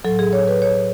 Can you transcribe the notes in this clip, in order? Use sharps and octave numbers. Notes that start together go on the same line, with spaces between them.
A2 F#3 A4
G#4
C#5
B4
C#5